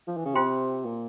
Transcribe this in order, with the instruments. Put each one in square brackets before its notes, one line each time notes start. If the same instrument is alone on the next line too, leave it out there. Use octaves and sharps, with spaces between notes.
[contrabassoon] F3
E3
C#3
[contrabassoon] C3 [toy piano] F4 C5 G5 C6
[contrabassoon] A#2